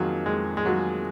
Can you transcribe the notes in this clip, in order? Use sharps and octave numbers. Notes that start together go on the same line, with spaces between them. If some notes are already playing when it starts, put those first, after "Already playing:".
Already playing: F2 D#3 F#3 A#3 F4 G#4
F2 G#3
G#3
D#3 F#3 A#3 F4 G#4